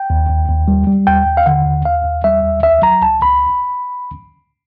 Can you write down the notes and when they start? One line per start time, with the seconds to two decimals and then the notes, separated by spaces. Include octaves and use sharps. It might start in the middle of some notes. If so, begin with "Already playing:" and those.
Already playing: G5
0.10 D#2
0.29 D#2
0.48 D#2
0.68 G3
0.87 G3
1.07 D#2 G5
1.26 D#2
1.37 F5
1.46 D3 F#5
1.65 D#2
1.85 D#2 F5
2.04 D#2
2.24 G3 E5
2.43 D#2
2.63 C#2 E5
2.82 F#3 A#5
3.02 C#2 A5
3.22 C#2 B5